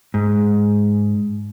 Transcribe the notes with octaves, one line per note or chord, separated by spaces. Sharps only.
G#2